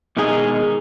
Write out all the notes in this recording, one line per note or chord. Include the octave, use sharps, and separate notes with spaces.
B2 D#3 G#3 D#4 G#4 D#5